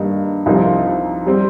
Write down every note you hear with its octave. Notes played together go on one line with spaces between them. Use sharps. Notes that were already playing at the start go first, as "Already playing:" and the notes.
Already playing: G2 D#3 G3 A#3 D#4
C2 C3 F3 C4 D#4
G3 C4